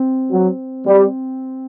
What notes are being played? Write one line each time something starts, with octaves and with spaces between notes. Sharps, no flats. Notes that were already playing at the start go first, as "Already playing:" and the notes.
Already playing: C4
F#3
G3